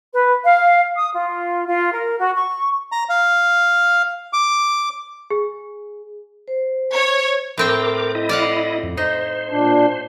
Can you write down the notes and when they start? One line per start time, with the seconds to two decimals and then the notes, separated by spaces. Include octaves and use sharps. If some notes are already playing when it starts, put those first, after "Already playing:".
0.13 B4
0.45 F5
0.97 D#6
1.14 F4
1.67 F4
1.92 A#4
2.19 F#4
2.35 C#6
2.92 A#5
3.09 F5
4.33 D6
5.30 G#4
6.48 C5
6.94 C#5
7.58 A2 C4 A#4 G5 D6
8.15 E4 D#5
8.29 D5 F5 F#5
8.83 F2
8.97 D#4 C5
9.51 A#2 D4